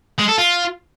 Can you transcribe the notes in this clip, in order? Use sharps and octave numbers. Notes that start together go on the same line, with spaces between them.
G#3
A4
F4